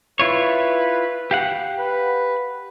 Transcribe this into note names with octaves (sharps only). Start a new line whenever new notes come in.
E4 F4 B4 C#5
G4 F5 F#5
B4